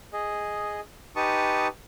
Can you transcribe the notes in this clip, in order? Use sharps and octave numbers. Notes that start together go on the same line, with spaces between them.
G#4 D#5
D#4 G4 B4 A5 C#6 D#6